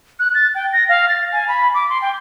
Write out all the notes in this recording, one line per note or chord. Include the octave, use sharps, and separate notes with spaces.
F#6
A6
G5
A#6
F5
A6
G#5
B5
D6
C6
G5